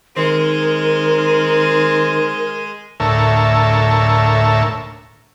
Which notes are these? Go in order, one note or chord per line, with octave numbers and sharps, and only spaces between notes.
D#3 G#3 C4 A#4 D#5
D2 A2 A#4 C#5 E5 A5